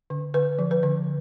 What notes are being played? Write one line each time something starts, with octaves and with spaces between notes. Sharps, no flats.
D3
D3 B4
F3
B4
D3